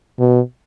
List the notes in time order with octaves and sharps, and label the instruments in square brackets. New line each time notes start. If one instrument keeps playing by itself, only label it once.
[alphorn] B2